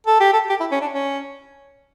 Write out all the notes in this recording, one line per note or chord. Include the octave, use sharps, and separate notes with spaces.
A4
G4
A4
G4
E4
C#4
D4
C#4